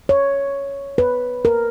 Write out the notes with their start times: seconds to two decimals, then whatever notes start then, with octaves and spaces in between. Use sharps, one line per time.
0.09 C#5
0.98 B4
1.45 A#4